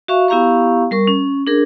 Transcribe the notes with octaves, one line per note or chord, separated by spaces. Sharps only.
F#4 E5 F5 C#6
B3 E4 G4 F5 A#5 C#6
G3 A#4 C#6
C#4
D4 G#4 A#4